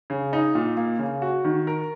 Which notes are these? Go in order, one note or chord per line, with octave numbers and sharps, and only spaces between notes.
C#3
D#4
A#2
A#3
C#3
F#4
D#3
A#4